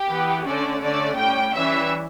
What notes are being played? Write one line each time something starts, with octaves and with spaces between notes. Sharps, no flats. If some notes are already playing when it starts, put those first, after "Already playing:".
Already playing: G4
E3 B3
D3 A3 C#4 D5
D3 A3 C#4 D5
A2 G3 C#4 G5
E3 G3 C#4 E5